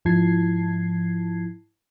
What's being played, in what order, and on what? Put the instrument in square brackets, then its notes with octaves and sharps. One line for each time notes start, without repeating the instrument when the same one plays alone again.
[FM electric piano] G#2 F3 E4 A5 G#6 C7